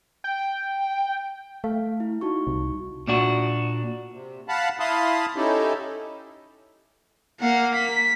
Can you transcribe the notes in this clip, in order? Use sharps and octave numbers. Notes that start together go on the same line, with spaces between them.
G5
A3 F5
E4
D#4 F#4 C#6
C2
A#2 D4 F#4
C3
F5 F#5 A5 B5
E4 F5 A5 B5 C6 D#6
C#4 D#4 E4 G4 A4
A#3 F5 F#5
B6